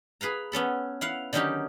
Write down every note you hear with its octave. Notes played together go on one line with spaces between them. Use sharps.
G#4 B4 F5 A#5
B3 C#4 A4 B5
E4 F5 F#5
D3 D#3 F#3 C#4 D#4 G4